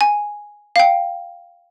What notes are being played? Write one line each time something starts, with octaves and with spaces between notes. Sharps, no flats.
G#5
F5
G5